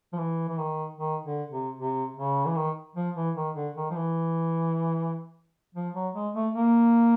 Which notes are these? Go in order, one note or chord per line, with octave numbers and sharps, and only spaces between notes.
F3
E3
E3
D#3
D#3
D3
C3
C3
C#3
E3
D#3
F3
E3
D#3
D3
D#3
F3
E3
F3
F#3
G#3
A3
A#3